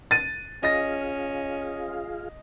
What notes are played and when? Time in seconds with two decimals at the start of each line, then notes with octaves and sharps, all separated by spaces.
0.11 A6 D#7
0.63 C#4 F4 G#4 D#5 F5 A#6